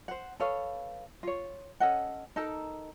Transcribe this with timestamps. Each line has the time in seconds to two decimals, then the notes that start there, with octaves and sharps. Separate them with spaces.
0.08 C5 F#5
0.40 A4 B4 C#5 F5
1.23 F4 C#5
1.80 C#4 A4 D#5 F#5
2.36 D#4 A4 A#4